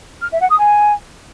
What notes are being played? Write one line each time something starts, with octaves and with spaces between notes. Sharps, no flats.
F6
E5
F#5
D#6
G#5